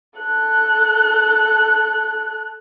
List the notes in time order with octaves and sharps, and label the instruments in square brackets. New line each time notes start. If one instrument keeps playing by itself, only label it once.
[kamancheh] A4 F#6